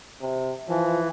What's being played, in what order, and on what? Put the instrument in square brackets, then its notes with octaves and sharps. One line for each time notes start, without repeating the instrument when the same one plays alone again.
[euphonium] C3
[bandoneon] E3 [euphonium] F3